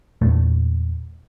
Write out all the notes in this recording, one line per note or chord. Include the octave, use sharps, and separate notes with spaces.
E2 A#2 A3